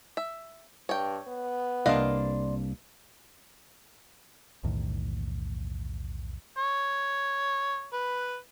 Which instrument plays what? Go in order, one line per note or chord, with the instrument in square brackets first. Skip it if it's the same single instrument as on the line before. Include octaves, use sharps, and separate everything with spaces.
[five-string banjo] E5
[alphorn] G2 [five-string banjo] C#5 G5
[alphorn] B3
[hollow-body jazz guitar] C2 A#3 D4 [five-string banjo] B4 D#5 F5 [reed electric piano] D5 C6
[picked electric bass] B1 E2 A2 D#3
[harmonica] C#5
B4